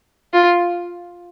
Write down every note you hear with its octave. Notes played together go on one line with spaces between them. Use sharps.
F4